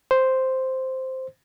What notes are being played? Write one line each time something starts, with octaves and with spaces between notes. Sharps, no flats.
C5